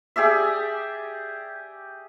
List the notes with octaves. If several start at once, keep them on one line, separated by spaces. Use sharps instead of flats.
G4 G#4 D5 E5